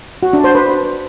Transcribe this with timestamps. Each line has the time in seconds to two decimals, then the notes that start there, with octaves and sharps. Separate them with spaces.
0.23 F#4
0.33 D4
0.44 C5
0.55 B4